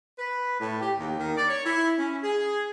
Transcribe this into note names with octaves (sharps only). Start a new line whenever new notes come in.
B4
A2
G4
D#2
D#3
D5
C#5
E4
C#4
G#4